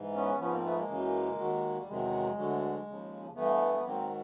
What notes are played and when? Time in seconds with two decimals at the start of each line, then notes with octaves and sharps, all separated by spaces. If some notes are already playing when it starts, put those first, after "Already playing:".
Already playing: G#2 E3
0.16 B3 C#4
0.40 G#2 F3 B3 C#4
0.52 A#3 C4
0.65 A3 B3
0.77 G#3 A#3
0.89 F#2 C#3 E3
1.39 D#2 D#3 F#3
1.79 G3
1.88 E2 C3 D#3 F#3 G#3
2.37 D2 D3 F#3
2.87 D#2 C#3 F3
3.36 G2 E3 A3 B3
3.75 B3
3.85 G#2 D#3 F#3 A#3 C4